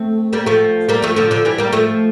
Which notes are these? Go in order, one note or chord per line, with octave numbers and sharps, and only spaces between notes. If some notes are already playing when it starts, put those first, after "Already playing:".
Already playing: A3 C4
G3 A#3
F3 A3
G3 A#3
F3 A3
D3 F3
D3 F3
E3 G3
G3 A#3
F3 A3